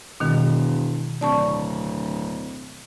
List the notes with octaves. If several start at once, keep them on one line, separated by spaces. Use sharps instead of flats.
E1 B2 D#3
D1 D5 A5 C#6